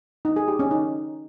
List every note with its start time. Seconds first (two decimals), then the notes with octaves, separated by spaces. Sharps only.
0.25 D#4
0.36 G#4
0.48 G4
0.59 C#4
0.71 D#4